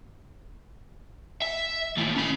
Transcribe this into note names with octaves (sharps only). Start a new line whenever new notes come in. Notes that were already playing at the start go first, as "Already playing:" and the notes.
E5
D#2 A2
C#4 B5